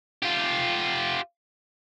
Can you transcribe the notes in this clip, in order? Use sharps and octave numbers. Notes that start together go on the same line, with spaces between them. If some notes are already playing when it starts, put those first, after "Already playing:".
F4 G4